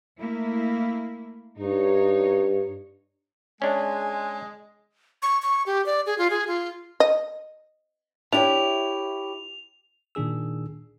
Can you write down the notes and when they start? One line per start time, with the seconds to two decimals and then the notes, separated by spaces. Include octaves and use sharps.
0.20 A3 A#3 E4
1.59 G2 D#4 C#5
3.62 G#3 C#4 D4 G#5
5.22 C#6
5.42 C#6
5.66 G4
5.86 D5
6.06 G#4
6.18 F4
6.30 G#4
6.47 F4
7.00 D#5
8.32 D4 E4 G4 C#5 F7
10.15 A#2 D#3 D4 G#4 E6